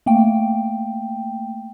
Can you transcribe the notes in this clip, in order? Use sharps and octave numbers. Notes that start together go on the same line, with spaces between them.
A3 A#3 G5